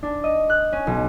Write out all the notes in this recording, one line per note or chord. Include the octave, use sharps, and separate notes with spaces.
D4
D#5
F#6
C#4
B1